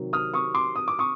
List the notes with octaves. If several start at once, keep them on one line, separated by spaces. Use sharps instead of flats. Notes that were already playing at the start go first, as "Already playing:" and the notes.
Already playing: C3 D#3 F#3
D#6 F6
C#6 D#6
C6 D6
D#6
D6
C#6 D#6